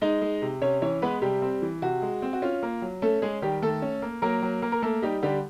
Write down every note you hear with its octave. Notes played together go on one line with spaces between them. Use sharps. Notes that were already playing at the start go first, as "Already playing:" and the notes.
G#3 D#4 D#5
G#3
C3
C3 C#4 C#5
E3 C#4 C#5
G#3 B3 B4
C3 G3 G4
C4
E3
C3 F#4
G#3
C4
F#4
C#4 F4
A#3
F#3
A3 C#4 A4
G#3 C#4 G#4
D#3 G3 G4
D#3 A3 A4
C#4
A#3
F#3 A#3 A#4
F#3
A#3
A#4
A3 A#3 A4
G3 D#4 G4
D3 G3 G4